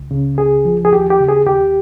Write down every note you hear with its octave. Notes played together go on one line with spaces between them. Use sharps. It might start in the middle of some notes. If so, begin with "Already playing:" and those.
Already playing: C#2
C#3
C#2 G#4
F3
G#4
D#2 G4
G4
C#3
G#4
D#2 G4